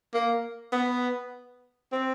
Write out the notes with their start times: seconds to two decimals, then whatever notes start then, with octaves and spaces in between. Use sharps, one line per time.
0.14 A#3
0.72 B3
1.92 C4